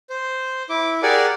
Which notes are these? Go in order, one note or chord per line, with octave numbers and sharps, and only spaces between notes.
C5
E4 D6
G4 G#4 A#4 D5 F#5 G#5